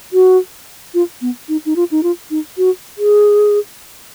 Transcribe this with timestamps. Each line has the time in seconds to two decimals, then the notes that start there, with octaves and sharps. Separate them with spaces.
0.13 F#4
0.94 F4
1.22 B3
1.49 D#4
1.66 D#4
1.76 F4
1.91 D#4
2.03 F4
2.30 D#4
2.58 F#4
2.98 G#4